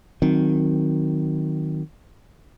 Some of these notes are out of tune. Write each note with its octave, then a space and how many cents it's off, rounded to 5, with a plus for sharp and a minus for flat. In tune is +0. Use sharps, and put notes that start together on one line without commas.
D#3 +0 F#3 +5 C4 +0